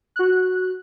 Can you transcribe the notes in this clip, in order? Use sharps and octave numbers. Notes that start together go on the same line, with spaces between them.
F#4 F#6